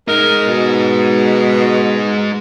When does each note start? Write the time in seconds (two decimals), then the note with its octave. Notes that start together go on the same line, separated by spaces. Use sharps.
0.08 G#3 D#4 A#4
0.45 B2